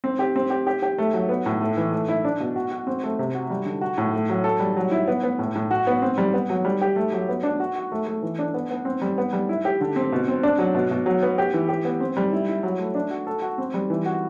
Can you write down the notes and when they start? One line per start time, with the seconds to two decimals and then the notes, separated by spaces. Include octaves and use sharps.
0.04 C4
0.19 G4
0.36 C4
0.50 G4
0.67 G4
0.82 G4
0.98 A3
1.14 F#3
1.29 B3
1.46 A2
1.61 A3
1.77 E3
1.92 A3
2.08 E4
2.25 D4
2.40 B2
2.56 F#4
2.72 F#4
2.87 C4
3.03 A3
3.19 C3
3.35 F#4
3.50 G3
3.65 D3
3.81 F#4
3.98 A2
4.13 A3
4.29 F#3
4.44 A4
4.60 G3
4.77 F#3
4.91 E4
5.08 B3
5.23 B3
5.39 A2
5.55 A2
5.71 F#4
5.87 B3
6.02 C4
6.18 G3
6.33 B3
6.50 F#3
6.65 G3
6.81 G4
6.96 A3
7.13 F#3
7.29 B3
7.43 D4
7.60 F#4
7.76 F#4
7.92 A3
8.07 A3
8.23 E3
8.39 D4
8.54 B3
8.70 B3
8.85 C4
9.02 G3
9.18 B3
9.33 G3
9.49 E4
9.65 G4
9.81 D3
9.96 C4
10.12 B2
10.28 C4
10.43 D4
10.59 F#3
10.74 B2
10.91 B2
11.06 F#3
11.23 B3
11.38 G4
11.54 E3
11.69 G4
11.85 B3
12.00 C4
12.17 G3
12.33 E4
12.48 E4
12.63 F#3
12.79 A3
12.95 D4
13.11 F#4
13.27 A4
13.42 F#4
13.58 C4
13.74 G3
13.90 E3
14.06 F#4